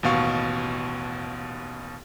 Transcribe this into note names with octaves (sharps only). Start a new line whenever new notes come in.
A1 D#2 B2 F5 C#6